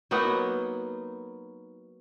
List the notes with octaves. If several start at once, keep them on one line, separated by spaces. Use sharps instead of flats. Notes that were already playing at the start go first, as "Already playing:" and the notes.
F#3 A#3 B3 D#4